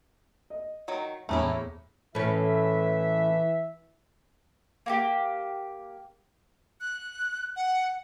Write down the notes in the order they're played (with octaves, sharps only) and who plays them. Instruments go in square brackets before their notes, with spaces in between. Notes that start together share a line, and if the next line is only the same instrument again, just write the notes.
[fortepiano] D#5
[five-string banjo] D#3 F#3
[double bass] E2 [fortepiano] A2 A#5 [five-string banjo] A3 C#4 E4
[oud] A2 C#4 [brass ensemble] E3 E5
[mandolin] A#3 F#4 G4
[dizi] F#6
F#5